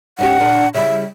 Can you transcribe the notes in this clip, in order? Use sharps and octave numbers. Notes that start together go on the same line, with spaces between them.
G#2 C#4 G4 F#5
A#2 D4 G#4
C#3 G3 E4 E5